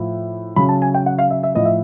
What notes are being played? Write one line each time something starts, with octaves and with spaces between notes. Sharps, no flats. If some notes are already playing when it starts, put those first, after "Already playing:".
Already playing: A2 F3
C#3 F#3 B5
A5
G#5
G5
F#5
F5
E5
E5
A2 F3 D#5
E5